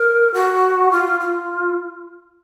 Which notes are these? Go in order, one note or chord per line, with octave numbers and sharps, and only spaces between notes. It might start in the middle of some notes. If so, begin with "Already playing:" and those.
Already playing: A#4
F#4
F4
F4